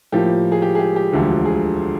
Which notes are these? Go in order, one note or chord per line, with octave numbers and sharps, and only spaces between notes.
A2 F3 A#3 G4
G#4
G4
G#4
G4
G4
E1 D2 D3 F3 G4
G#4